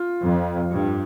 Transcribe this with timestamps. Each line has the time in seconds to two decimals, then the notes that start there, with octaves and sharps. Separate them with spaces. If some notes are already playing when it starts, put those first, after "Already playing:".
Already playing: F4
0.22 F2
0.71 G2